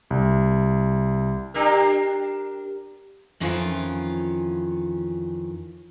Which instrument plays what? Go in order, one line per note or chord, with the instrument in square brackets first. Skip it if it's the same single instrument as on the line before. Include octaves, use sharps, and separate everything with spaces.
[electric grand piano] C2
[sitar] D4 G4 A#4
[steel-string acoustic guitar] F2 D#3 E3 C#4 F4